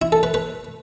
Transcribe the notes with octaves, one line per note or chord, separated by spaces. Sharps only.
E4
A4
B4
B4